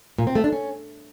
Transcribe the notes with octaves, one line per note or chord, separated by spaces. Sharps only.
A#2
C4
A3
D4
C#4